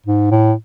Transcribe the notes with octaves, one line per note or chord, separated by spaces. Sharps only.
G#2
A2